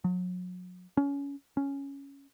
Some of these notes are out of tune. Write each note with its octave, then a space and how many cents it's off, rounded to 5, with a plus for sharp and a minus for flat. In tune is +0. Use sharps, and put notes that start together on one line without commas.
F#3 -35
C#4 +25
C#4 +5